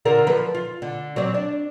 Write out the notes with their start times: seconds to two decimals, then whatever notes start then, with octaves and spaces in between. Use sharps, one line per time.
0.05 D3 F4 A#4
0.27 F3 B4
0.54 F4
0.82 D3
1.16 F#3 C4 D5
1.34 D4